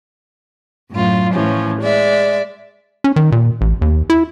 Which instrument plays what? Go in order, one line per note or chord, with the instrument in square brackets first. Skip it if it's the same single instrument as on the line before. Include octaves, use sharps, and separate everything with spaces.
[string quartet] F#2 A2 F4
A2 E3 F3 C#4
G#3 D5 E5
[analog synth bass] C#4
D#3
A#2
A1
D#2
E4